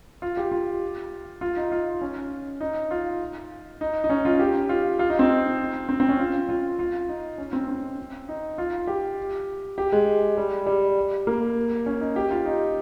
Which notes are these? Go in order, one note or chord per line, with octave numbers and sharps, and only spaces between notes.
F4
G4
F4
F4
D#4
F4
C#4
D#4
F4
D#4
D#4
C#4
F4
G4
F4
F4
D#4
C4
C4
C4
C#4
F4
F4
F4
D#4
C#4
C4
C4
D#4
F4
G4
G4
G#3
G3
G3
A#3
C#4
D#4
G4
F4
D#4